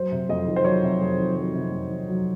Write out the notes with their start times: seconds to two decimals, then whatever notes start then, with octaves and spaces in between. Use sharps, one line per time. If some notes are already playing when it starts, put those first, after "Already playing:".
Already playing: F#3 C5
0.12 C3
0.29 F2 D#5
0.47 D#3
0.56 C5
0.65 F#3 C#5
0.83 C3
1.01 F2
1.18 D#3
1.36 F#3 C5
1.55 C3
1.72 F2
1.90 D#3
2.08 F#3